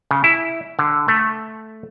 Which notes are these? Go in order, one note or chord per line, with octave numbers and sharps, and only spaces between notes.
C#3
E4
D3
A3